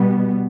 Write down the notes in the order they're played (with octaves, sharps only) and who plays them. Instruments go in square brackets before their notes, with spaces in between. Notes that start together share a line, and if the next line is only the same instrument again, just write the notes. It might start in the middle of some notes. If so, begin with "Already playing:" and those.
Already playing: [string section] B2 G3 B3